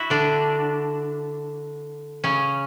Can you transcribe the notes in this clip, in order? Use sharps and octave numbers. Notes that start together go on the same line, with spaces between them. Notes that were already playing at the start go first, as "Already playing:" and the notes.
Already playing: E4 F#4
D3 D4
C#3 C#4